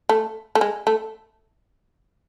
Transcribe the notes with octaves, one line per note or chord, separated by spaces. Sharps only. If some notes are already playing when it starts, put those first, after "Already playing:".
A3
A3
G#3
A3